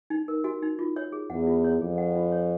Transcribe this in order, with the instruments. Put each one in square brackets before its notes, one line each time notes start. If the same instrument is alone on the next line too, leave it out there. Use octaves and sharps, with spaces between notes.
[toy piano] D#4
A#4
F#4
D#4
F4
C#5
G#4
[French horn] E2 [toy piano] F#5
[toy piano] F4
C#5
[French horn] F2 [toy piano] G#4
[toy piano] F#5
F4
C#5